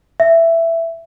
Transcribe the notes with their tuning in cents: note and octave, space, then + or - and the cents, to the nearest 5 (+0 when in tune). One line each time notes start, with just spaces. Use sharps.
E5 +10